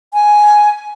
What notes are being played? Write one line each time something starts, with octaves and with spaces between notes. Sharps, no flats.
G#5